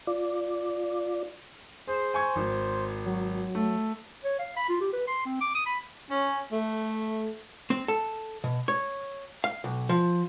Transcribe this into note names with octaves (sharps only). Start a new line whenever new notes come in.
F4 D5
G#4 C5
G#5 C#6 G#6
G#1
F#3
A3
C#5
F5
B5
F4
G4
B4
C6
C4
D6
D#6
B5
C#4
A3
C4
A4
B2
C#5
F5
B1
F3